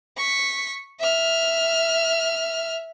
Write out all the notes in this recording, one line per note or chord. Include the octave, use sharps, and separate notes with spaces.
C#6 B6
E5 F6